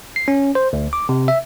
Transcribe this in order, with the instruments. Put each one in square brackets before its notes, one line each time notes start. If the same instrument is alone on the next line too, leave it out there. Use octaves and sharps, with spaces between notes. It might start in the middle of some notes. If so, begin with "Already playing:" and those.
[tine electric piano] C7
C#4
C5
D2
D6
C3
E5